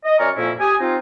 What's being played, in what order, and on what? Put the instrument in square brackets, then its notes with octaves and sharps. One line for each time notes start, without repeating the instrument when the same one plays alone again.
[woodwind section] D#5
F#2 D5 G#5 A#5 C#6 F6
F2 A#2 A#3 C#4 E4 E6
G4 G#5 D#6
C4 D#4 F4